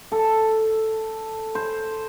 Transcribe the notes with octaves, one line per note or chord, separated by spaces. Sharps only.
A4
C5